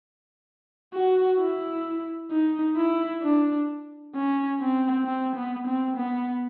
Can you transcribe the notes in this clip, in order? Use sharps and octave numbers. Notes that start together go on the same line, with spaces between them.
F#4
E4
D#4
E4
D4
C#4
C4
C4
B3
C4
B3